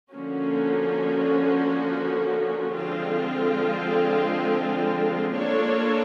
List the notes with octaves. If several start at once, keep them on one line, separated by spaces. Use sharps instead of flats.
D3 F3 A#3 C#4 F#4
D3 F3 G#3 C4 F4
A#3 D4 F4 A4 C#5